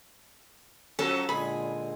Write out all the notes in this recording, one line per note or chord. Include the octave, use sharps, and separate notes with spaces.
F3 F#3 C#4 A4
A#2 D3 G#3 G#4 B5